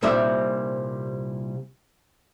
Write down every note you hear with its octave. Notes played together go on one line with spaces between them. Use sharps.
C2 A#2 G3 C4 D#4 E5